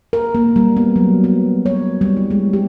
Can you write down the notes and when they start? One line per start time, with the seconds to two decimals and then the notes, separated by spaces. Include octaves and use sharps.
0.13 A#4
0.35 A#3
0.56 G3
0.77 B3
0.96 F#3
1.24 B3
1.66 C#5
2.01 G3
2.17 E4
2.31 G#3
2.53 G4